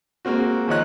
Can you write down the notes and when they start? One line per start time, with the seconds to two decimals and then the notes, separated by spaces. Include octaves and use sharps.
0.25 G#3 A#3 C4 F#4
0.67 D#2 F3 F4 C#5 D#5 F#6